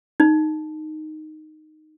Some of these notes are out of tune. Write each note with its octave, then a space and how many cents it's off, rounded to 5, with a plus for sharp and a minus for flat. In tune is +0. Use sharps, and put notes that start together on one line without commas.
D#4 -5